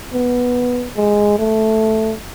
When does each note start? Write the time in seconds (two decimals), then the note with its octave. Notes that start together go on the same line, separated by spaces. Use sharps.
0.13 B3
0.96 G#3
1.39 A3